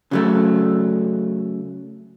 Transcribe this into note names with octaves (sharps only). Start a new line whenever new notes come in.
C#3 F#3 A3